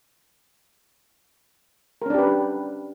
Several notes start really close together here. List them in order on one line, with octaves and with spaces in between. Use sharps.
A#4 C#4 D4 G4 B4